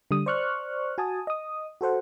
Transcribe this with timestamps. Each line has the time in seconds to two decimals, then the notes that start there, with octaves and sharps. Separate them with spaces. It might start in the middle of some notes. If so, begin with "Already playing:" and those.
0.11 D3 G3 D#6
0.26 C5 D5 C#6 F6 F#6
0.98 F#4 G#5 A5 D#6
1.27 D#5 D#6
1.81 F#4 A4 C5 F#5